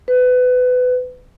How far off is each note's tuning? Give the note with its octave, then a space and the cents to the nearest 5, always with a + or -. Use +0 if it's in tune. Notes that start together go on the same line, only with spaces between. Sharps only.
B4 +25